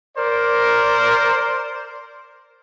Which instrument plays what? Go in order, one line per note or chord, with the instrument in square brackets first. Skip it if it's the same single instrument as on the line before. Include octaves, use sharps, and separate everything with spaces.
[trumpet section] A#4 C5 D5